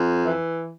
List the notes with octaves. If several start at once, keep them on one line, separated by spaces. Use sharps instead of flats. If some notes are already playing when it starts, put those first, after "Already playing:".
Already playing: F2
E3